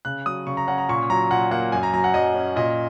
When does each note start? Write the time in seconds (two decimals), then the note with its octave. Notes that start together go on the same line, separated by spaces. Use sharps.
0.05 C#3 F#6
0.26 F#3 D#6
0.47 C#3 C#6
0.57 A#5
0.68 C#4 F#5
0.78 A#5
0.89 A#2 C#6
1.10 F#3 A#5
1.30 A#2 F#5
1.51 A#3 F#5
1.72 F#2 G#5
1.83 A#5
1.93 F#3 A#5
2.04 F#5
2.14 F#2 D#5
2.35 C#4
2.56 A#2 D#5